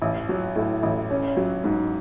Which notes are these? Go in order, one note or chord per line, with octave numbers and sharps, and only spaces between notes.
A1
F#3
A2
A1
C#4
F#3
G#2